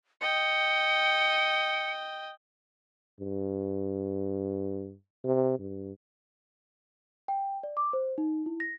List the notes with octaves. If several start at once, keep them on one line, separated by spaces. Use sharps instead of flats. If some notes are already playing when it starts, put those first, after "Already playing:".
D#5 G5 C#7
G2
C3
G2
G5
D5
D6
C5
D#4
E4
A#6